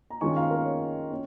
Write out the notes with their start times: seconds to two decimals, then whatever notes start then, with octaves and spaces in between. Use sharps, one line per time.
0.10 A#5
0.21 D#3 G#3 C#4 F4 G#5 C#6
0.36 F5 A#5
0.51 A#4
0.66 C#5
1.11 C#4